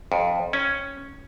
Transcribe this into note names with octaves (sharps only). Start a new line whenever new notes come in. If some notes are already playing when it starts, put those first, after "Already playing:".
F2
C#4